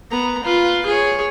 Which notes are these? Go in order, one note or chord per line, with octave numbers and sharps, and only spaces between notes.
B3 A#5
F4 B4
G#4 C#5